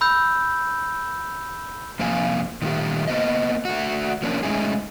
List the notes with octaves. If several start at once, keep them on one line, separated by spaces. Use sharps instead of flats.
B5 E6 G6
F2 C3 F3 A#3 F5 G#5
A#2 D#3 G3 A3 F4 G4
A#3 B3 C5 D#5
A3 F#4
F3 A#3 C#4 D4
G#3 A3 C#4 D#4 E4 G#4